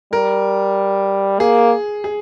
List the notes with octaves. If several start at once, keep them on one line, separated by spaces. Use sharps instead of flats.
G3 A#4
A#3 G#4
G#4